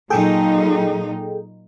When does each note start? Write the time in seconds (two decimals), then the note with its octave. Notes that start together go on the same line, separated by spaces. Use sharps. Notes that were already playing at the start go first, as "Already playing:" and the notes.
0.10 A#2 F#3 D#4 G#4 A4 G5